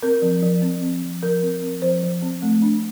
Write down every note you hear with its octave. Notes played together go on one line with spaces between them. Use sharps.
C4 A#4
F3
F3
C4
C4
F3
F3 A#4
C4
C4
F3 C5
F3
C4
A3
D4